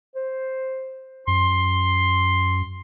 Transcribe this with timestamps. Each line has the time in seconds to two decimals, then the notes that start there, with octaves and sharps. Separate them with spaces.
0.16 C5
1.27 F#2 C6